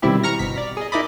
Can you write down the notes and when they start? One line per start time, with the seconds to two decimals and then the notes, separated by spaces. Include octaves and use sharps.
0.02 B2 D#3 G3 C4 E4 G4
0.23 A#5 C#6 F6 A#6
0.39 G1 B2 B6
0.57 D5
0.77 G#4 D#5
0.92 D#4 E4 A#4 D5 D#5 B5